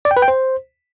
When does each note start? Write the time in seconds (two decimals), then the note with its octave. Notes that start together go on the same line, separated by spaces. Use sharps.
0.05 D5
0.11 G5
0.17 B4
0.22 G5
0.28 C5